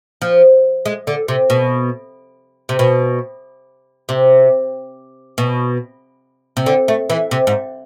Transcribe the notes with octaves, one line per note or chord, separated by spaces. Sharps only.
F3
G#3
D3
C3
B2
C3
B2
C3
B2
C3
D3
A3
E3
C3
G#2